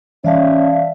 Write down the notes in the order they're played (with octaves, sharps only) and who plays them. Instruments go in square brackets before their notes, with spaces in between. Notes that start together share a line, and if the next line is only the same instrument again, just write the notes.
[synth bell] E3 [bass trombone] C#4 [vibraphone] D5 F5 A5 [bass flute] E5